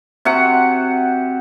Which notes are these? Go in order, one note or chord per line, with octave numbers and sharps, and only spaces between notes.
C3 F#4 F#5